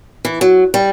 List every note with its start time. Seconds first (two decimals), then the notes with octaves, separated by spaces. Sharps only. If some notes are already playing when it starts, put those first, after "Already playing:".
0.25 E3
0.41 F#3
0.74 G3